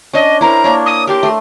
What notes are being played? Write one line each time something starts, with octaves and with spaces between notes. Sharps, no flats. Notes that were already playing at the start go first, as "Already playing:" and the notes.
C#4 D4 D#5
E4 A#4 C5 A#5
A#3 D4 C#5
D#6
G4 A#4 A5 C6
A3 C6